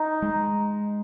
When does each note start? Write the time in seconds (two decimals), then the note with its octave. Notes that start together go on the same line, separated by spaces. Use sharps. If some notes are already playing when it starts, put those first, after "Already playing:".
Already playing: D#4
0.22 G#3